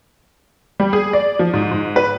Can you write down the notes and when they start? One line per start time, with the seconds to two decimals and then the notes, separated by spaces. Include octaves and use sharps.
0.80 G3
0.93 G#4
1.13 D5
1.39 F3
1.54 G#2
1.71 G#2
1.96 B4